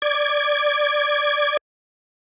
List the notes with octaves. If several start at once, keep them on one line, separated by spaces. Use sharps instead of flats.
D5 G#6